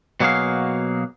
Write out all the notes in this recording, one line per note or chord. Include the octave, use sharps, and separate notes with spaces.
B2 F#3 A#3 F#4 G#4 F5